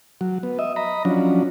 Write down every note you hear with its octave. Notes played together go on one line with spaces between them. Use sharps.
F#3
B3
D#5 E5
D#5 A#5 B5
F3 F#3 C#4 D4